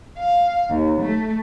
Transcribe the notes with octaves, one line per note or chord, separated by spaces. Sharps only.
F5
D#2
A3